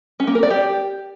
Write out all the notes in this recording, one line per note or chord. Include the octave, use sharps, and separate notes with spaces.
C#4
A#3
A#4
D5
G4